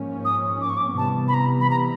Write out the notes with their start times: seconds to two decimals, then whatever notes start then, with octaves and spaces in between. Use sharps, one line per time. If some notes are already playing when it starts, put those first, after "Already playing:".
Already playing: G#2 F3 A#3 C#4
0.25 D#6
0.61 D6
0.69 C#6
0.77 D6
0.97 C3 E3 G3 B3 A5
1.28 B5
1.34 A#5
1.60 B5
1.70 A#5